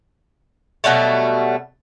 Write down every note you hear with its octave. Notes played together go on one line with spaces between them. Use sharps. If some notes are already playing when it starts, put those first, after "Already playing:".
B2 F#3 G3 A3